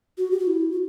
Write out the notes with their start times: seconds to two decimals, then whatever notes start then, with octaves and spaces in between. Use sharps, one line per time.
0.18 F#4
0.31 G4
0.39 F#4
0.47 E4
0.71 F#4